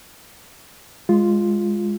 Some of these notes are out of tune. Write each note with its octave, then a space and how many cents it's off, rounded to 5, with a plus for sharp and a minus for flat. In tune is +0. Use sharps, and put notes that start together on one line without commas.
G#3 -10 F4 +0